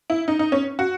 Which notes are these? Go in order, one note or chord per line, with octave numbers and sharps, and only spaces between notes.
E4
D#4
D#4
C#4
F#4